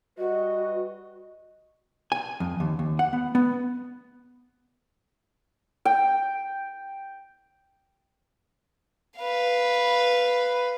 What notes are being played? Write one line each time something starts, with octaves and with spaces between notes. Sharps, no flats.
G3 F#4 B4 D#5
G#5
F2
D#2
D#2
F#5
B3
B3
G5
B4 F5